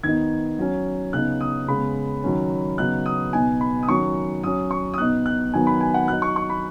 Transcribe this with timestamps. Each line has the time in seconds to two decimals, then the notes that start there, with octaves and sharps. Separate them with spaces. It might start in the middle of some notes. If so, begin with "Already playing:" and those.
0.03 D#3 B3 D#4 G#6
0.59 F#3 C#4
1.13 C#3 B3 D#4 F#6
1.41 D#6
1.68 C#3 G#3 B3 B5
2.24 D#3 F#3 C#4
2.78 C#3 F#3 B3 D#4 F#6
3.06 D#6
3.33 B2 B3 D#4 G#5
3.61 B5
3.83 D#6
3.88 D#3 F#3 C#4 C#6
4.43 F#3 C#4 D#6
4.71 C#6
4.94 D#6
4.98 B2 B3 D#4 F#6
5.26 F#6
5.53 D#3 F#3 B3 D#4 G#5
5.67 B5
5.81 G#5
5.94 F#5
6.08 F#3 D#4 F#6
6.22 C#6
6.36 C#6
6.50 B5